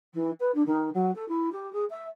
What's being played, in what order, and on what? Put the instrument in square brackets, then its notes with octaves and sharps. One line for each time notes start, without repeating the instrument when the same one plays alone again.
[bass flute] E3
B4
D4
D#3
F#3
A4
E4
G4
G#4
E5